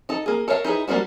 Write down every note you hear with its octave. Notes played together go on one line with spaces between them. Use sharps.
D#4 A4
A#3 G#4
A4 A#4 C#5 D5 F5
D#4 E4 G#4 B4
G3 A#3 C#4 D4 F#4